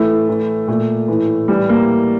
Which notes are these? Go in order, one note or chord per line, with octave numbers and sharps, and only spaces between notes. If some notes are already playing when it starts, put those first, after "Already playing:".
Already playing: A2 E3 A3
A2 E3
A#2 A3
A2 E3
A2 E3 G3
A#3